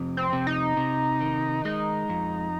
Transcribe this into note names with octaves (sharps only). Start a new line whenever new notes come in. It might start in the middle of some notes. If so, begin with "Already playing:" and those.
Already playing: F2 C3
C4
C3
D#4
C3
D#3
G#3 D#4
F2